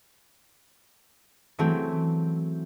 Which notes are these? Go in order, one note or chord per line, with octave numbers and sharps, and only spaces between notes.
E3 F#3 A3 C4